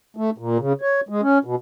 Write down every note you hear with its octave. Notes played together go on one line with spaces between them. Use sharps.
A3
A#2
C#3
C#5
G#3
C#4
B2